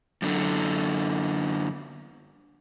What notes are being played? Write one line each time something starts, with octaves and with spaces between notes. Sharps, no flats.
F#2 D3